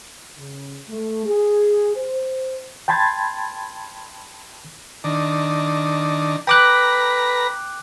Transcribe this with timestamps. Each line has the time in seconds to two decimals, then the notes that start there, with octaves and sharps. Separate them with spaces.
0.39 C#3
0.89 A3
1.25 G#4
1.96 C5
2.88 G5 A5 B5 C6 G#6 A6
5.04 D#3 D4
6.47 B4 G5 A#5 D6 F#6